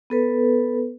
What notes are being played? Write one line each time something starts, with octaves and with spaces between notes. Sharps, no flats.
B3 A4 B4